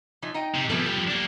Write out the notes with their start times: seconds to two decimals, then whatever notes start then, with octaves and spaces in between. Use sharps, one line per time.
0.22 E3 F3 D#4
0.34 D#4 D#5 G5
0.55 C3
0.70 E3 F3 G3 B3 A4
0.86 G4
1.08 A#3 D4